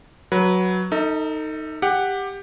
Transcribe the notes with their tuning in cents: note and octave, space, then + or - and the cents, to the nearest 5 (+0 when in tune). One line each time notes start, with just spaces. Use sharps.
F#3 +0 B4 -15
D#4 +0 A4 +35 E5 -45
G4 +15 F#5 +0